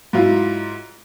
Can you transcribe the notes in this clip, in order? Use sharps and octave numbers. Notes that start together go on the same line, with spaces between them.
G#2 F#3 E4 F4